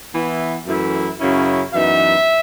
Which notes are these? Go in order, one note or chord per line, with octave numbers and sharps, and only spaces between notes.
E3 B3 E4
F#2 E3 A3 E4
F#2 C#3 F#3 C#4 E4
F#2 E3 B3 D#4 E5